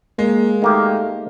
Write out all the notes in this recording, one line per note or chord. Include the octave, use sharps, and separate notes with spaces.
G#3 A#3
D#3 A3 A#3 G4